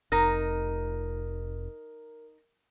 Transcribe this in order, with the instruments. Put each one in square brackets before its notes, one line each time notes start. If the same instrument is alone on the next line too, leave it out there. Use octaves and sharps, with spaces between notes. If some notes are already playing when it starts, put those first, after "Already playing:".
[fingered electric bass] F1 [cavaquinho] D#4 A#5 [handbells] A#4